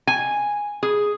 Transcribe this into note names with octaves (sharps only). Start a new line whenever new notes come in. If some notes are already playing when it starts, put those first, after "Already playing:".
G#5
G#4